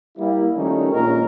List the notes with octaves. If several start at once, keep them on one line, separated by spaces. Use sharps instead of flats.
G3 A#3 E4
D#3 F3 G3 A3 C#4 D#4
A#1 A#2 G#3 C#4 A#4